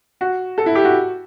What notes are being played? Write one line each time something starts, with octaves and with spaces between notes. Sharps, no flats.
F#4
A4
E4
G4
F#4